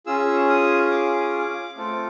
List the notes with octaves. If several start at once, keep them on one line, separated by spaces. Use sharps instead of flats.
C#4 F4 G#4 E6
D#6
D6
A3 C4 F4 A4